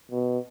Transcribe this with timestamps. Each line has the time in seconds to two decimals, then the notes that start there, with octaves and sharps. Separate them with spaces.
0.11 B2